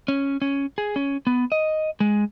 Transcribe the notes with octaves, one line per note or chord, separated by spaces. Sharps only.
C#4
C#4
G#4
C#4
B3
D#5
G#3